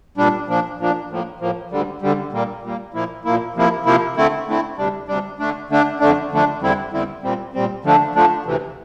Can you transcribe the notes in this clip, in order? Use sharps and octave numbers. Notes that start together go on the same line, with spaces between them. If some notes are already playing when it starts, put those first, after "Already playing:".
A#2 G3 D4
A#2 F3 A#3 D4
A#2 F3 A#3 D4
A2 F3 A#3
A2 F3 A#3
D2 D3 G3
D2 D3 G3
A#2 G3 A#3
A#2 G3 A#3
A#2 F3 A#3 E4
A#2 F3 A#3 E4
C3 F3 A#3 E4
C3 F3 A#3 E4
D3 A3 C4 E4
D3 A3 C4 E4
D2 C3 G3 D4
D2 C3 G3 D4
D3 A3 D4
D3 A3 D4
F2 D3 A3 D4
F2 D3 A3 D4
E2 D3 G3 C4 E4
E2 D3 G3 C4 E4
A#2 G3 C4
A#2 G3 C4
D3 F3 A3 D4
D3 F3 A3 D4
D2 C3 E3